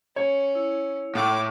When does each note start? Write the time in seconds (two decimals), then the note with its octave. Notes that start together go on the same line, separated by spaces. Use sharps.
0.16 C#4 C#5
0.55 E4
1.15 A2 D6